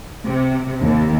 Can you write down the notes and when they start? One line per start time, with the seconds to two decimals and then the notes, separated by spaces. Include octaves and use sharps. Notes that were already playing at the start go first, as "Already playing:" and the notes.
0.24 C3
0.85 D#2